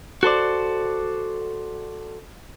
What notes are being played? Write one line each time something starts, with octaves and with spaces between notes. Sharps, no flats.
F#4 A4 C5 D5